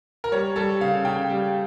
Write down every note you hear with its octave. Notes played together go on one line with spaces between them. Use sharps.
A#4
G3 C#5
G3 A4
C#3 F5
C#3 G5
G3